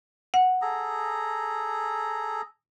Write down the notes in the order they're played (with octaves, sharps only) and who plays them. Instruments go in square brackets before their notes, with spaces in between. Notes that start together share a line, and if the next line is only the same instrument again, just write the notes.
[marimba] F#5
[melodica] G#4 A4 A#5